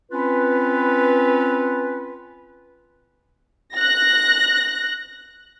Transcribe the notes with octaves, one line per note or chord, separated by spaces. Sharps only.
C4 C#4 F4 B4
F#6 A#6